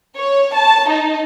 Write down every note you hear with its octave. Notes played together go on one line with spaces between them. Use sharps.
C#5
A5
D#4